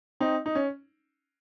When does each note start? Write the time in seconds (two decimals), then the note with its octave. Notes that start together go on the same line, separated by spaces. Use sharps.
0.20 C4 D#4
0.46 D#4
0.55 C#4